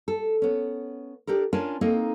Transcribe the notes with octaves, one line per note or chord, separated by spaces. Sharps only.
A4
B3 C#4
D4 G4 A4 A#4
C#4 D4 F4 A#4 G#5 A5
A#3 C4 D#4 A4 D#5